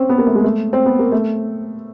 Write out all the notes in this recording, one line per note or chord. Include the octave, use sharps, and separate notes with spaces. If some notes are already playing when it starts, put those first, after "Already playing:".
Already playing: C4 C#4
B3
A#3
A3
G#3
A3
C4
B3
A#3
A3